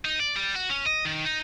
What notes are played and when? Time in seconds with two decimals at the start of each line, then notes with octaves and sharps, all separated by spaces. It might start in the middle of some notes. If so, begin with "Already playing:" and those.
0.05 D#4
0.20 D5
0.36 G3
0.56 F#4
0.70 C#4
0.86 D#5
1.05 D#3
1.25 D#4